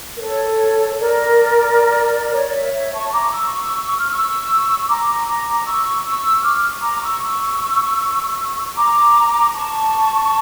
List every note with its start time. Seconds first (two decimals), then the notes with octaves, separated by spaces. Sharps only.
0.17 A#4
0.21 A4 C#5
0.99 A#4 D5
2.32 C#5
2.43 D5
2.54 C#5 E5
2.73 C#5 E5
2.93 A5 C#6
3.13 A#5 D6
3.32 C#6 E6
3.98 F6
4.09 C#6 E6
4.88 A#5 D6
5.27 A#5 D6
5.65 C#6 E6
6.04 C#6 E6
6.43 D6 F6
6.82 A#5 D6
7.01 C#6 E6
8.76 A#5 D6
9.54 A5 C#6